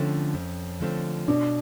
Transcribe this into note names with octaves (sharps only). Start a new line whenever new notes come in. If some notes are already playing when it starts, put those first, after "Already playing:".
Already playing: D3 F3 A3 C4 C#4
F2
D3 F3 A3 C4
B2 D4